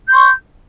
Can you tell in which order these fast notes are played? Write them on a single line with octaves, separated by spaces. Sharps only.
G6 C6 C#6